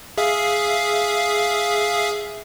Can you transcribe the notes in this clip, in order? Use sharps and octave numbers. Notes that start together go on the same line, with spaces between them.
G#4 E5 F5